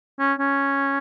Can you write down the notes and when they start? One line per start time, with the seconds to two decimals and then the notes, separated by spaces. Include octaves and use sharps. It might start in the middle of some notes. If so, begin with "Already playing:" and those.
0.20 C#4
0.39 C#4